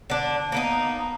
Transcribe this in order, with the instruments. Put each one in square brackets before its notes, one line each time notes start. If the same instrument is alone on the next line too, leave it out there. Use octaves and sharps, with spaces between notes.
[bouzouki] D3 D4
A#3 B3 D#4